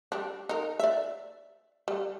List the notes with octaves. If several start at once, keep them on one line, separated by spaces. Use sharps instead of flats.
G3 D4
D#4 A#4
D5 E5
G3